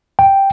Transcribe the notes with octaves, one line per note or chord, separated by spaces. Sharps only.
G5